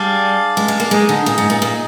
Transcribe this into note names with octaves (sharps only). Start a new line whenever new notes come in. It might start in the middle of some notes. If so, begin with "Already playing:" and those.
Already playing: G3 D4 G#4 D5 F5
G#3
G#3
A#3
G#3 D#4 G#4 D#5
D3
A#2
G#2
A#2
A#2